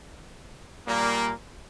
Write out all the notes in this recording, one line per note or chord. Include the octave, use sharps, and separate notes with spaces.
A#2 G3 A#3